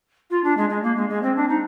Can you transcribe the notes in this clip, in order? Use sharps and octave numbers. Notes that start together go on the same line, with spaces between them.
F4
D4
G#3
G#3
A#3
G#3
G#3
C4
D4
D#4